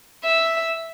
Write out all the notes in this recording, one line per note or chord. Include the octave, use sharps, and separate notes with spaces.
E5